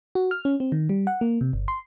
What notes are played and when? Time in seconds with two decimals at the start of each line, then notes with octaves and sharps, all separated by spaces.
0.15 F#4
0.31 F6
0.45 C#4
0.60 C4
0.72 D#3
0.89 G3
1.07 F#5
1.21 A#3
1.41 C3
1.53 G1
1.68 C6